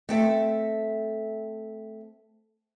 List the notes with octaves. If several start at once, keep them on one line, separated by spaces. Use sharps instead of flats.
A3 C4 A4 E5